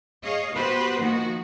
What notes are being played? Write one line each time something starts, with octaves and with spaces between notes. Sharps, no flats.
G#4 C#5 D#5 F5
B3 F#4 G4 B4 C5
D#3 F3 A#3 F#4